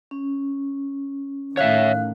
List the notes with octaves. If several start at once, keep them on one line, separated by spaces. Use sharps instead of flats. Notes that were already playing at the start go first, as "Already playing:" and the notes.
C#4
A2 D#3 C#5 E5 F5 F#6